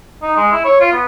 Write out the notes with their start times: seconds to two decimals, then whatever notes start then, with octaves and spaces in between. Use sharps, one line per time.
0.22 D#4
0.37 G#3
0.52 E4
0.65 C#5
0.80 F4
0.92 B3